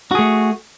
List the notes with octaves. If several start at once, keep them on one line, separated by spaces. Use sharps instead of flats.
A3 F#4 G#4